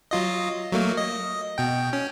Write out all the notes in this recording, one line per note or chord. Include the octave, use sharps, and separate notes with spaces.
F#3 F4 D#5
F#3 A3 A#3
D#5
B2 G5
C#4